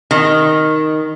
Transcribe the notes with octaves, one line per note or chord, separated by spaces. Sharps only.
D#3